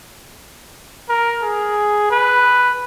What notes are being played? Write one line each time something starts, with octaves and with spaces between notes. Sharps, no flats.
A#4
G#4
B4